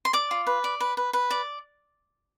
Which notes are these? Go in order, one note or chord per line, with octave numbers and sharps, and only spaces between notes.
C6
D5 D6
F4
B4
D5
B4
B4
B4
D5